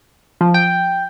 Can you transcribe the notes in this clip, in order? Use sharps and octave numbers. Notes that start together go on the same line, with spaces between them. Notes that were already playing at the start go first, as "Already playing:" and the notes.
F3
G5